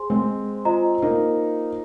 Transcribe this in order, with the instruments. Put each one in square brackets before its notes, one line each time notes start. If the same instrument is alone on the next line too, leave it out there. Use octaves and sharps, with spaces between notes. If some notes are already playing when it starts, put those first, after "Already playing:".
Already playing: [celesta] G#4 C5 G#5 C6
[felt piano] G#3 C4
[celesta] F4 C5 D#5 A#5
[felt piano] A#3 D#4